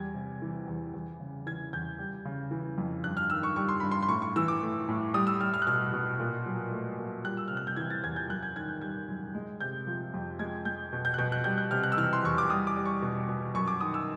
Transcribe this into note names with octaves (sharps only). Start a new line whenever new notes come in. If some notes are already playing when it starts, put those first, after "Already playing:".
Already playing: E2 G3 G#6
C3
E3
E2
E2
C#3
E3 G#6
E2 G6
G3
C#3
E3
F2
G2 F#6
F6
D#3 E6
C#6
G3 C#6
C6
G2 B5
C6
C6
A2 C#6
C#6
E3 E6
D6
A3
A2
G3 D#6
E6
G3 F6
F6
F#6
B2 F6
B2
A#2
F#3
A3
A#2
G3 F#6
E6
C3 F6
F#6
G6
E3 G#6
A6
E2 G#6
G6
F#2 F#6
G#6
D#3 G#6
G6
G3 G#6
F#2
G#3
C3 G6
F3
F2
G#3 G#6
G#3 G6
B2
G6
F#6
B2 G6
F#6
G3 G6
F#6
C3 F6
F#6
E6
E3 F6
C6
E2 C#6
D6
G3 D#6
D6
G3
C#6
B2
B2
F#2 C#6
D6
D#3 D#6
E6